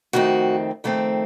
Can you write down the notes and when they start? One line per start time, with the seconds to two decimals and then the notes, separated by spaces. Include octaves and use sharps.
0.13 F2 D#3 A3 C4 F#4
0.84 F2 D#3 A3 C4